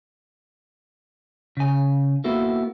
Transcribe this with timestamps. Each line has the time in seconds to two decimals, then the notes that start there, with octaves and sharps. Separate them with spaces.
1.57 C#3 G#5
2.24 A#3 B3 E4 F#4 A4